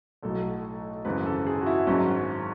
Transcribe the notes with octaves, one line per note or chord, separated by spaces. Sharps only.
B1 A2 F#3 A4
G#1 F#2 C#3 E3 B4
A4
G#4
F#4
E4
G#1 G#2 F#3 C#4